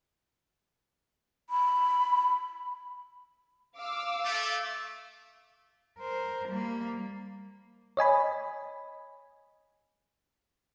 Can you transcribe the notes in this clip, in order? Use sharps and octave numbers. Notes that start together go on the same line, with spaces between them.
B5
F5 D6 E6
A3
A#4 C5
G3 A#3
C#5 D#5 G#5 B5